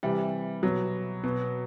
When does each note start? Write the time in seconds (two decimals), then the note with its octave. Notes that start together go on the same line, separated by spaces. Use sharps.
0.03 C3 E3 G3
0.63 B2 F#3
1.24 B2